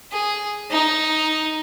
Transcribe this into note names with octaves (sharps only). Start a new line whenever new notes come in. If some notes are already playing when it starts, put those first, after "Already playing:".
G#4
D#4